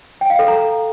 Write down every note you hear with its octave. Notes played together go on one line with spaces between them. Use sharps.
G5
F5
A4
A#5